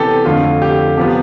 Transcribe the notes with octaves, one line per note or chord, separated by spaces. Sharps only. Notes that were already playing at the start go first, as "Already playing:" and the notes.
Already playing: C3 E3 B3 G4 A4
F2 D3 A3 F4
G4
C3 F3 B3 G4